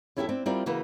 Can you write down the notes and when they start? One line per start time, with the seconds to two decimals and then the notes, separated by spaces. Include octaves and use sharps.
0.16 E2 C#4 E4 G4 A4 E5
0.29 C4 D4 E4
0.46 G3 C4 E4 F4 A#4 D5
0.66 C#3 E3 A#3 F#4 B4